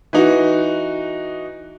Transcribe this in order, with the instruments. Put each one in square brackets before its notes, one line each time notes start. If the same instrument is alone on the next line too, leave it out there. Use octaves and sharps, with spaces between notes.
[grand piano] E3 D#4 F#4